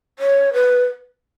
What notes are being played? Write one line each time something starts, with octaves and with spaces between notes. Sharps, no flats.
C#5
B4